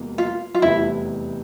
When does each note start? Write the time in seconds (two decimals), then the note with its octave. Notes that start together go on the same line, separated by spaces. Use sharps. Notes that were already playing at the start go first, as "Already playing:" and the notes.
Already playing: E1 E2 C3 E3 A#3
0.18 F4
0.55 F4
0.62 F1 E2 C3 E3 G3 E4